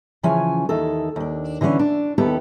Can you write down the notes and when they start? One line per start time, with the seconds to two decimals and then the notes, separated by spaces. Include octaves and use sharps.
0.23 C#3 E3 F3 C#4 G#5
0.69 D#2 E3 D#4 A4
1.16 D#2 D4
1.61 D3 E3 G#3 C#4 D4
1.79 D4
2.18 D#2 B3 E4 G4 A4